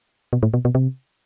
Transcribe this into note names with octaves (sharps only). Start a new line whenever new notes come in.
B2
A2
B2
B2
C3